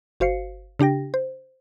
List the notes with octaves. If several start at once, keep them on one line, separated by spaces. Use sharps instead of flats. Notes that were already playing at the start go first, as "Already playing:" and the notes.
G1 F#4 C5 F5 C7 C#7
C#3 D4 G4 G5 A#6
C5